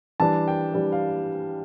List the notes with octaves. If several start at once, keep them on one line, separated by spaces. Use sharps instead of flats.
E3 G3 D4 A5
G5
E3 G3 D4
F5